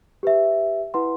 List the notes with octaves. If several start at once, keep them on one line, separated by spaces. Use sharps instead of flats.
G4 B4 E5
E4 B4 F#5 C6